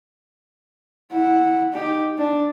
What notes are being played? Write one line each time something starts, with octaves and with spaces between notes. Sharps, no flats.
E4 F#5
D#4 G4
D4